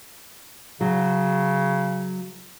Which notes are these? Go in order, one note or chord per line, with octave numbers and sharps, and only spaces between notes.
C#3 F#3